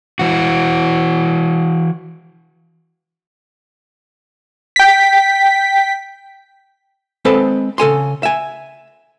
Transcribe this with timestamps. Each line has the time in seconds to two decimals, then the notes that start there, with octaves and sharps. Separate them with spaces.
0.19 E3 F#4
4.76 G5 B6
7.25 G#3 C4 A4 B4 D#5
7.78 C#3 A4 G#5 C6
8.23 E5 G#5